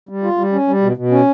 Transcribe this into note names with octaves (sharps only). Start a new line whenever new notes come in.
G3
F4
G3
C#4
G3
B2
B2
C#4